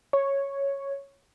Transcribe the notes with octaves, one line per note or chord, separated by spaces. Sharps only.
C#5